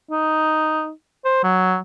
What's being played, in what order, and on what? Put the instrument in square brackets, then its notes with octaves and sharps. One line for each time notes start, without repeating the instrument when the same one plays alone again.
[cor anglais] D#4
C5
F#3